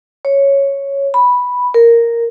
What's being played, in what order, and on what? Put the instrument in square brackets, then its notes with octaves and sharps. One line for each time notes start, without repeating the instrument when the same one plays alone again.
[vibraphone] C#5
B5
A#4